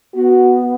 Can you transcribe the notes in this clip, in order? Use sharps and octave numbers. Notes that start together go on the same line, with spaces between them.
B3 F#4